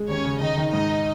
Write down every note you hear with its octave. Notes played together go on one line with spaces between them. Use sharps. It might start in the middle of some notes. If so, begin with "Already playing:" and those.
Already playing: G#3
D#2 C#4 C#5
C#3
D#3 D#4 D#5
D#3
G#2 D#4 D#5